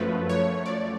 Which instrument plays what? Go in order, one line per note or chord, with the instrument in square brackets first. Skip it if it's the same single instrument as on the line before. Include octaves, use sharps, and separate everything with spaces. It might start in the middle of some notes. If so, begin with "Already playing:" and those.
Already playing: [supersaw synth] F#2 F3 A3 B4
C#5
D5